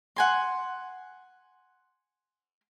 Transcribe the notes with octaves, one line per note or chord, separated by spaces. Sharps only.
F#5 G#5 C6